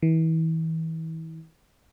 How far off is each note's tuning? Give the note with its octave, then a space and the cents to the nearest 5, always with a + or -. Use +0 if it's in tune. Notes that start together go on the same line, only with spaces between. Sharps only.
E3 -35